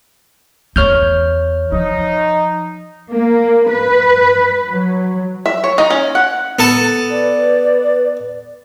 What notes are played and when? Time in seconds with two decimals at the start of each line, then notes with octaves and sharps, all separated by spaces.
0.76 E2 C#5 F6 G6
1.72 F3 D#4
3.12 A#3
3.71 B4
4.69 F#3
5.46 E5
5.64 C#5
5.78 D#4
5.90 C#4
6.15 F#5
6.59 B3 A4 A5
7.11 B4 D5